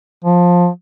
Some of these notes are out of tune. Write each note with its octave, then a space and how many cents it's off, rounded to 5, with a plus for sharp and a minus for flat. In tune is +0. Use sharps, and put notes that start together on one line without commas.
F3 +15